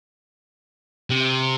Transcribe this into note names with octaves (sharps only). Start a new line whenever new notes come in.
C3